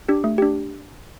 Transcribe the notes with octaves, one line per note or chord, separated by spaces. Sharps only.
D4 G4
A3
D4 G4